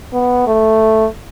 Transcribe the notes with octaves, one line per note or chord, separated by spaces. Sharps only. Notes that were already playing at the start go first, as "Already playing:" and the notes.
B3
A3